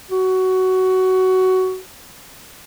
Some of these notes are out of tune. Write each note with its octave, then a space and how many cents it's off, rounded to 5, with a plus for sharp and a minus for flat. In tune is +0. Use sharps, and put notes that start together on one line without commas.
F#4 +15